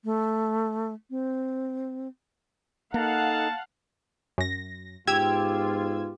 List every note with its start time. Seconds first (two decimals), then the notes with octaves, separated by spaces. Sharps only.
0.04 A3
1.10 C4
2.94 A#3 D#4 A4 F5 F#5 A5
4.38 F#2 A#6
5.07 G#2 B3 F4 G4 E6 G#6